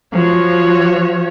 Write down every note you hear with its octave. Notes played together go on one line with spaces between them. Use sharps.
F3 F#4 C#5